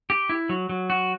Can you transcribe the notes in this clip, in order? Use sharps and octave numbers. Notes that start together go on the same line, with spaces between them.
G4
E4
F#3
F#3
F#4